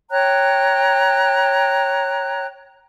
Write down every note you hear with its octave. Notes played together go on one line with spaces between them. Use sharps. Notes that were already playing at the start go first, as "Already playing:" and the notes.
C#5 G5 A#5 F#6